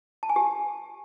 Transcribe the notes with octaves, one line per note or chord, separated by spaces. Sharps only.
A5
G#5
G4